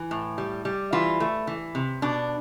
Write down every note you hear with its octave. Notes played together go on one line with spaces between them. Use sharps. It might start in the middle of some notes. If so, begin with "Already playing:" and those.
Already playing: E3
A2
G3
G3
E3 F4
A3
E3
C3
B2 D4